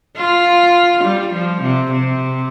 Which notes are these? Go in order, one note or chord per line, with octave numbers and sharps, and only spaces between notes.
F4
G3
F3
C3
C3